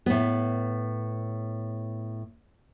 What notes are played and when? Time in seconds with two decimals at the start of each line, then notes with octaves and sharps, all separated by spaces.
0.06 A2 B3